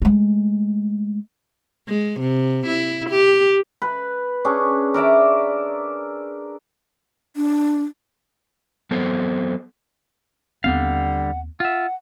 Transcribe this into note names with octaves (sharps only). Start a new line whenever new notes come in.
G#3 A3
G#3
C3
E4
G4
B4
C#4 D4 G#4
A#4 D5 E5 A#5
D4
F#3 B3 C4 A4 C5
D#2 D3 G3 B3 C4 F5 F#5
F4 E5 F#5